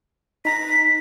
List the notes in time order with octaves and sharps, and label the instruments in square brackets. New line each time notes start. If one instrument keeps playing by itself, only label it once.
[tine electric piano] D#4 A#5 A#6 [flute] B6